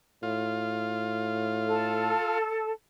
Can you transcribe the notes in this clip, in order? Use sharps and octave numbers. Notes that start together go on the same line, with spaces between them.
A2 F4
A4